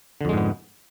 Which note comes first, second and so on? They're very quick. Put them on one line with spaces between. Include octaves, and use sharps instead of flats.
D3 F2 G#3 G#2 B3